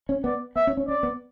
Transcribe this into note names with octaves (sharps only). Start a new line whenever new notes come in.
C#4
B3 D5
B3 E5
C#4
C#4
C#4 D5
B3